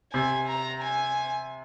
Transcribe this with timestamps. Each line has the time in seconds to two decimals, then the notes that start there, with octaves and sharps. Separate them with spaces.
0.13 C3 G#5
0.48 A#5
0.82 G#5